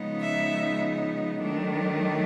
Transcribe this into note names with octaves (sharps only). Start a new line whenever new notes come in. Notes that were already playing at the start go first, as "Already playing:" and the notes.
Already playing: C#3 F3 G#3 B3 D#4
E5
D#3 F#3 A3 D4